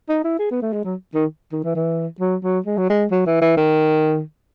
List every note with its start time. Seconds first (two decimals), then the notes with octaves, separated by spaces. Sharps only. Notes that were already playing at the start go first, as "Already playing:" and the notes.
0.09 D#4
0.24 E4
0.39 G#4
0.51 B3
0.62 A3
0.73 G#3
0.85 F#3
1.15 D#3
1.53 D#3
1.64 E3
1.75 E3
2.20 F#3
2.43 F#3
2.66 G#3
2.78 F#3
2.90 G#3
3.11 F#3
3.26 E3
3.42 E3
3.57 D#3